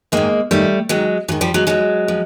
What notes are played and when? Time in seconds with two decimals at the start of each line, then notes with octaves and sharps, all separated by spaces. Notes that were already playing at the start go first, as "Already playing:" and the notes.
0.12 G#2 D#3 G#3 A#3
0.51 G#2 D#3 G3 A3
0.89 G#2 D#3 F#3 G#3
1.28 G#2 F#3
1.32 D#3
1.41 F3 G3
1.54 F#3 G#3
1.67 G#2 F3 F#3 G#3
2.08 F3